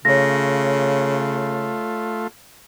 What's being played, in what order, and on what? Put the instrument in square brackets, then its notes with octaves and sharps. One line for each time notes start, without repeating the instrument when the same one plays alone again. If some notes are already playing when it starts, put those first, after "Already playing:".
[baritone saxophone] C#3 [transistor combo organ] A3 F4 [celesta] C#5 A#6